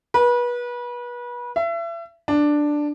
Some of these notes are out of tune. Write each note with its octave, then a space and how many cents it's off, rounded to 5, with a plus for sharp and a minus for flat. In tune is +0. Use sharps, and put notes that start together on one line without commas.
B4 -30
E5 +35
D4 +5